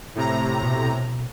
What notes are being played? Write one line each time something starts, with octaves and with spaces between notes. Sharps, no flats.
A2 C3 A#5
B2